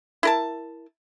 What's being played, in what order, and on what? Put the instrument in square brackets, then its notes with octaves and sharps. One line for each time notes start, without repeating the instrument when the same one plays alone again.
[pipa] E4 A#4 A5